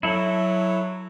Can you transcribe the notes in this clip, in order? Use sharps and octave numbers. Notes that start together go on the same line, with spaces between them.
F#3 E4 A4